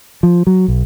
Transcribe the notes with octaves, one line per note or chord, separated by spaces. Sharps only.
F3
F#3
B1